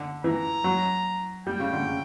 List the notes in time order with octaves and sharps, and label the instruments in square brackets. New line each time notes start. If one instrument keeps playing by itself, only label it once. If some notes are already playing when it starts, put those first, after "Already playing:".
Already playing: [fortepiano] D3
[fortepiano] E3 [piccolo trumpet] A#5
[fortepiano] F#3
[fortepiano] G3 [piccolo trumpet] G5
[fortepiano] C#3
D3
C#3